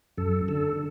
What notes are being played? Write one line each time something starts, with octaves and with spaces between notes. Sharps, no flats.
F#2 A4
D3 A4